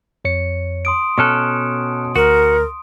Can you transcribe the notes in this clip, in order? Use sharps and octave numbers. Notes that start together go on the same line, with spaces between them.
F2 C#5 C#7
C6 D#6 D7
B2 C#4 A4 C#6 F6 F#6
D2 F#4 A#4